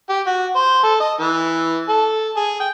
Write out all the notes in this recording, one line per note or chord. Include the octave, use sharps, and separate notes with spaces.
G4
F#4
C5
A4
D#5
E3
A4
G#4
G5